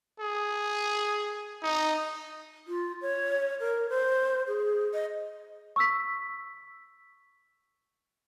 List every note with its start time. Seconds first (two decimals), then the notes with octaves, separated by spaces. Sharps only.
0.20 G#4
1.63 D#4
2.68 F4
3.02 C#5
3.60 A#4
3.89 C5
4.48 G#4
4.93 D#5
5.76 C#6 E6 B6